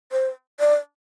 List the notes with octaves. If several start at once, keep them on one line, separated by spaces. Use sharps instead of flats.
C5
D5